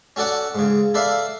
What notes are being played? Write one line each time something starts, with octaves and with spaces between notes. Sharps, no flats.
C#4 F#4 A4 D5 F#5
G#2 C#3
A4 B4 D5 E5 F5